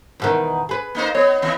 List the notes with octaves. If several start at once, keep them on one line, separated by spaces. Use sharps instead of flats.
E2 B2 D#3
G#4 B4
A#3 D#4 C5
B3 C#5
D#3 B3